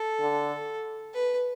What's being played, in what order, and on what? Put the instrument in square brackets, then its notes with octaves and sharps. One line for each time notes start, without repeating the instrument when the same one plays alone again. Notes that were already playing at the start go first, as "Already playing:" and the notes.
Already playing: [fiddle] A4
[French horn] D3
[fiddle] B4